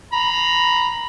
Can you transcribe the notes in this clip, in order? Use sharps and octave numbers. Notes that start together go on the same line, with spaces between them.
A#5 B5